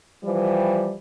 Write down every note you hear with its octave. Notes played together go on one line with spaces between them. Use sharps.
E3 F3 G3